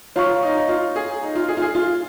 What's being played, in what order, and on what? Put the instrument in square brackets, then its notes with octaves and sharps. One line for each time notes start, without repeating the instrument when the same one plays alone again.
[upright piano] F4 [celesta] C#5 F5 A#5 C#6
[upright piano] D#4
D#4
F4
G#4
D#4
F4
G#4
F4
G#4
F4